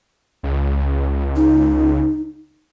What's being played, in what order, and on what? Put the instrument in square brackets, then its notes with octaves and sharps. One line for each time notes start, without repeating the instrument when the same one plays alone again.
[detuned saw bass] C#2
[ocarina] D#4